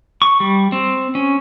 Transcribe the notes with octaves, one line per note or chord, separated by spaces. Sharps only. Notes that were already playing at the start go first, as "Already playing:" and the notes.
C#6
G3
C4
C#4